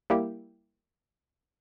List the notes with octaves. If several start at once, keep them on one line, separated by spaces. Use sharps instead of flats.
G3 A#3 E4 G4